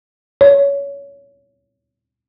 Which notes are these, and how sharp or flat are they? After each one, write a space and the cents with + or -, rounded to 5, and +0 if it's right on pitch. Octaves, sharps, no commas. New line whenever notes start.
C#5 +20